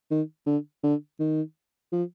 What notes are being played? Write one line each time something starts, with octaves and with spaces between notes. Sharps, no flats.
D#3
D3
D3
D#3
F3